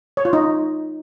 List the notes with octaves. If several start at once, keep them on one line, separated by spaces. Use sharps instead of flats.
C#5
F4
D#4